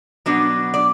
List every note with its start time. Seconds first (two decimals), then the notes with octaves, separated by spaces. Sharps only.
0.26 B2 F#3 B3 D4
0.74 D5